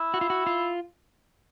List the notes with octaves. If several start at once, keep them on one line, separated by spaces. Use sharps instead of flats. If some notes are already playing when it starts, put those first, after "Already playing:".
Already playing: E4
F#4
F4
F#4
F4